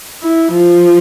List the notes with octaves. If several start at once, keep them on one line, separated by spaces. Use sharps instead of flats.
E4
F3